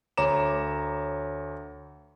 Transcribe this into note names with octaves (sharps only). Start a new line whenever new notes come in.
D2 C#5 A#5 D6 E7